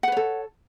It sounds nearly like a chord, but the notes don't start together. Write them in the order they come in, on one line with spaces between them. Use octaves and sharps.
F#5 B4 C#5 A4